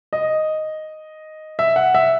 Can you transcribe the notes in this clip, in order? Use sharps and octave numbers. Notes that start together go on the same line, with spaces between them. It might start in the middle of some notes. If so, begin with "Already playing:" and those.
D#5
E5
F#5
E5